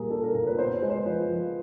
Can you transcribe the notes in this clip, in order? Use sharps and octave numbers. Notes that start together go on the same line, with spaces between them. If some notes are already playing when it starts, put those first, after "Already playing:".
Already playing: A#2 G3 A#3 G#4 A#4
D4 A4
A#4
A#2 A#4
B4
B3 C5
C5
G#3
C5
F3 B4
F3